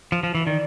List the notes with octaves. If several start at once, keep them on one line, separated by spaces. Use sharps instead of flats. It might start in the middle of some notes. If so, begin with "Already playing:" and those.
F3
F3
E3
D#3 D5